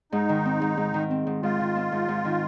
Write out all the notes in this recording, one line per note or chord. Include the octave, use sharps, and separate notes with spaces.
G#2 D#4
D#3
C4
G#2
G#2
D#3
C4
G#2
G#2 F4
D#3
C4
G#2
G#2
D#3